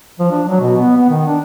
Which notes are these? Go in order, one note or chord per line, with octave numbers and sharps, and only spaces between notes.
F3
D4
F#3
B2
B3
B3
D#3
D4